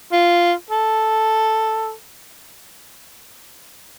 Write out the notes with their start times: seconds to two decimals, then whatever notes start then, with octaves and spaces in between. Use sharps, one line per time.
0.12 F4
0.70 A4